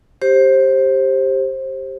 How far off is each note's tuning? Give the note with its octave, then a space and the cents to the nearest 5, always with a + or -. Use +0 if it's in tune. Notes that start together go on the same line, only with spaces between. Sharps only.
G4 +0 C5 +20